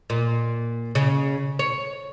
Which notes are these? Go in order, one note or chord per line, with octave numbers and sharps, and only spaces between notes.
A#2
C#3
C#5